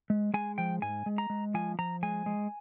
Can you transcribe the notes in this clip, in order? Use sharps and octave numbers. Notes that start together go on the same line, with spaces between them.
G#3
G#3 G#5
F3 G5
G#2 G#5
G#3
A#5
G#3
F3 G#5
F3 A#5
G#3 G#5
G#3